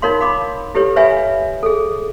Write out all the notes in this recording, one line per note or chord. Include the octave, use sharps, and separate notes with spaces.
D#4 F4 A#4 C#5 F5 C6
F5 B5 D6
E4 G4 A4 B4 C#5
B4 C#5 E5 F5 G#5 B5
G#4 A4